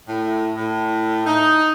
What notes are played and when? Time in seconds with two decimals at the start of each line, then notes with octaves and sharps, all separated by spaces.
0.08 A2
0.56 A2
1.26 D#4